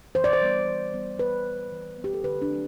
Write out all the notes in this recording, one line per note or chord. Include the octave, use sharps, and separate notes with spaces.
E3 C5
D5
C5
G3 B3
E3
G3 B3
E3 B4
B3
E3
B3
G4
A4
D3 B4
D4
F#3 A3 C4